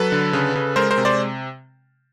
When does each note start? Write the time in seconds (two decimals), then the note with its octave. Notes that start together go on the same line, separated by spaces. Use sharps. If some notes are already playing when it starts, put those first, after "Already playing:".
Already playing: F#3 A4 B4
0.12 D3
0.33 C#3
0.55 C#3
0.76 G#3 A#4 C5
0.91 A#4 C5
0.98 C3
1.05 C5 D5